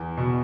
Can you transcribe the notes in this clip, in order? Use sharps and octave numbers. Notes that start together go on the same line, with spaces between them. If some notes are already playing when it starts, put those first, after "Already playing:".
Already playing: E2
B2